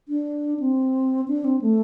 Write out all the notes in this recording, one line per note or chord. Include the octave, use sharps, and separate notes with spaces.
D4
C4
D4
C4
A3